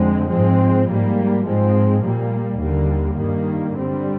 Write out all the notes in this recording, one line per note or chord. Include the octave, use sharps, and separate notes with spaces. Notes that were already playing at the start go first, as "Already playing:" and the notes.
Already playing: F2 D3 G#3 C4
G#2 F3 G#3 C4
G#2 G3 A#3
G#2 F3 G#3 C4
A#2 G3 A#3
D#2 D3 G3 A#3
G2 D#3 G3 A#3
G2 D3 G3 C4